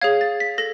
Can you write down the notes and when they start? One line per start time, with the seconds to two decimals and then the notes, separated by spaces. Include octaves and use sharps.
0.01 G#4 C#5 F5 G#6
0.21 A6
0.40 B6
0.58 A4 A#6